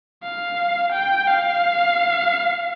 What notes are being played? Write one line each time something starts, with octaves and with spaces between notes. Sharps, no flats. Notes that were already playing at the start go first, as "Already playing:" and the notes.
F5
G5
F5